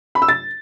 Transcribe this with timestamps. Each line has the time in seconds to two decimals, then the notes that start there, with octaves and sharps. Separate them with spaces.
0.15 B5
0.22 E6
0.28 A6